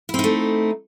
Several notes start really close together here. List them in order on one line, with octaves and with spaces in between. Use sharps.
E4 C4 D#4 A3